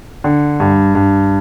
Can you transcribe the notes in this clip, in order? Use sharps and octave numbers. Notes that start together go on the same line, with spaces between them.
D3
G2
G2